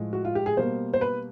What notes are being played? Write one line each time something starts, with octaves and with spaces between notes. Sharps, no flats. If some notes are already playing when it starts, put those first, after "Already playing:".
Already playing: A2 F3 G#3
F#4
F4
G4
G#4
B2 G3 A#3 C5
C5
B4